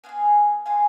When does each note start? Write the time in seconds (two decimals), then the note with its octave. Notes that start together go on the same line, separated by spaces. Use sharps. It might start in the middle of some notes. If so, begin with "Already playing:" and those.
0.04 B3 F4 F5 G#5
0.09 G#4
0.66 B3 F4 G#4 F5 G#5